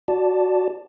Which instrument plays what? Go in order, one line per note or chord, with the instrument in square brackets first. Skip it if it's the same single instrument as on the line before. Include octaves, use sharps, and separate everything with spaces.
[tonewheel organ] F#4 D5 A5